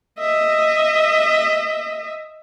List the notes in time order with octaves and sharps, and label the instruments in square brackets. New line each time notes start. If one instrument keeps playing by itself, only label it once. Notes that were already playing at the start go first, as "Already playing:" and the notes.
[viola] D#5 E5